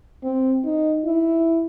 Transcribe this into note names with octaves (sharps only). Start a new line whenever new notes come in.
C4
D#4
E4